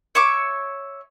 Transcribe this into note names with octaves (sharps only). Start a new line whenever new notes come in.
C#5 E5 C#6 D6